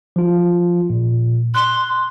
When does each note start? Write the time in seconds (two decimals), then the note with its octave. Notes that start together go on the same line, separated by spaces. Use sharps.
0.16 F3 F4
0.90 A#2
1.55 C6 F#6